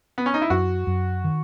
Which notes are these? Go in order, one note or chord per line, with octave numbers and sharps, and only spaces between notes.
B3
C#4
D#4
E4
F#2 F#4
F#2
D#3